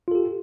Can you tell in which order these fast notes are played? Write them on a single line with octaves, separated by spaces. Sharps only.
F4 A4 G4